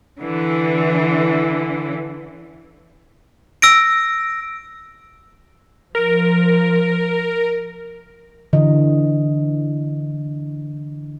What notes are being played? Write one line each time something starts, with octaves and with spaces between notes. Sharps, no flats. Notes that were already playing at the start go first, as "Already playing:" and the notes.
D3 E3
E6 A#6 D7
F3 A#4
D3 E3 D#5